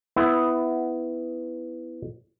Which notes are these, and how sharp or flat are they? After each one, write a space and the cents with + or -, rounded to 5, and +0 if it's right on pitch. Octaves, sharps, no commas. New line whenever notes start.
B3 +15 E4 +0